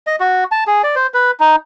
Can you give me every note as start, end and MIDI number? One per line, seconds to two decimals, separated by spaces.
0.07 0.16 75
0.20 0.44 66
0.51 0.64 81
0.67 0.82 68
0.83 0.95 74
0.96 1.07 72
1.14 1.31 71
1.40 1.56 63